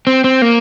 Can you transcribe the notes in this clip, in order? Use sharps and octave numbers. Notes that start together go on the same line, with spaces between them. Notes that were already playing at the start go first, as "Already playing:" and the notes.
C4
C4
A#3